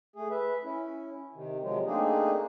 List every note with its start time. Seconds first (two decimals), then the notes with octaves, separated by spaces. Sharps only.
0.16 A3 G#4
0.30 B4 E5
0.64 C#4 E4
1.34 C3 D#3
1.62 C3 F3 F#3 G#3
1.86 A3 A#3 C4 D4 D#4 G#4